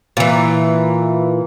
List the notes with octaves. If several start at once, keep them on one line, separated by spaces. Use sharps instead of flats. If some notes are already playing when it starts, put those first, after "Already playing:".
A#2 E3